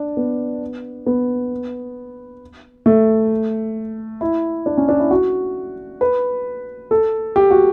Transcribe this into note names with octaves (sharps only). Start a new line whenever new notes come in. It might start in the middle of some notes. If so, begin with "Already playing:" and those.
Already playing: D4
B3
B3
A3
E4
D4
C#4
D4
E4
F#4
B4
A4
G4
F#4